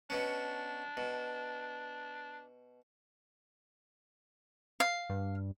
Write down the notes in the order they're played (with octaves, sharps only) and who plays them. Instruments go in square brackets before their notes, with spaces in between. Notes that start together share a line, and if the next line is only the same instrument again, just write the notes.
[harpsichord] B2 B3 C#4 [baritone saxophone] D4
[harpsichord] B2
[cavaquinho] F5
[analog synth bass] G2